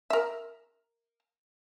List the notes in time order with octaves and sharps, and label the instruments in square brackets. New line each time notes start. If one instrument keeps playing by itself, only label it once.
[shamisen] A#4 E5